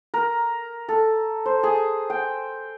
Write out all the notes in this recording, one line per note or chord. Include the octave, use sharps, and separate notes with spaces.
A#4
A4
C5
G#4
G5